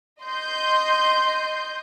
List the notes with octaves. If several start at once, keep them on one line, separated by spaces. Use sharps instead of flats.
D#5 C6 G6